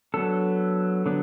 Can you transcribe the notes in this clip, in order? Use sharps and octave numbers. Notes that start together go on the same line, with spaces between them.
F#3 B3 D4 A4
D3 F#3 B3 D4